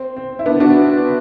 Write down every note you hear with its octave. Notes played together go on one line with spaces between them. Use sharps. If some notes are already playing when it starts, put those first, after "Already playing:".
Already playing: C4
C4
E4
B3 D4
D4 F#4